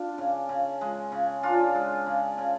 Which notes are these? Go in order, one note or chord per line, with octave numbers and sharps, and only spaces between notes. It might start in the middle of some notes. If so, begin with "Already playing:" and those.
Already playing: D4 F4
C#3
C#3
G#3
C#3
D4 F4
G#3
C#3
C#3